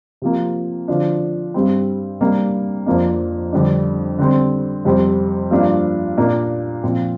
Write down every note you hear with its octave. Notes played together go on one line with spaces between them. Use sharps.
C3 F3 A#3
D3 F3 D4
G2 G3 C4
C3 G3 A#3 D4
F2 F3 A#3 D4
F2 D3 G3 D4
D3 G3 C4
F2 C3 G3 C4
G2 F3 A#3 D4
A#2 A#3 D4
A#2 F3 C4